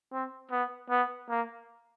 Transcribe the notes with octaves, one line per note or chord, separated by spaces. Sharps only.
C4
B3
B3
A#3